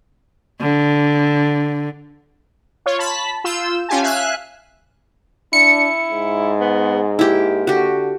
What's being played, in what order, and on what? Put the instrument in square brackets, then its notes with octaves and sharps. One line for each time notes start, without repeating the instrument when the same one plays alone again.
[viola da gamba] D3
[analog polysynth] F4 C#5
A5 B5 B6
F4 E6 G6 E7
C#4 F4 G4 G#5 A5
E5 F5 G#5 F#6
[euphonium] D4 [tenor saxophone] E4 [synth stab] C#7
[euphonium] G#2
[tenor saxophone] B3
[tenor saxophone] A#3 [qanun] E4 G4
[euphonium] D3 [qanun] F#4 G4